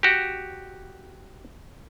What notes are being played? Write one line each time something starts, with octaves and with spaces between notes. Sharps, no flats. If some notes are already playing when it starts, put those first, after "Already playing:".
F#4 G4